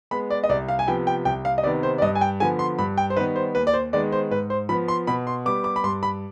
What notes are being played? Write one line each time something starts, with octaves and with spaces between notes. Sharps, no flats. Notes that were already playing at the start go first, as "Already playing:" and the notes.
G#3 B3 B5
D5
D#5
C2 D5
F5
G#5
C3 F3 B3 G5
G5
C2 G5
F5
D#5
C3 D#3 B3 D5
C5
D5
G2 D#5
G#5
G5
D3 F3 B3 G#5
C6
G2 B5
G5
C5
D#3 G3 B3 B4
C5
D#2 B4
D5
C5
D#3 G#3 B3 D5
C5
G#2 B4
C5
F3 B3 B5
C6
B2 B5
C6
G3 B3 D6
D6
B5
G2 C6
B5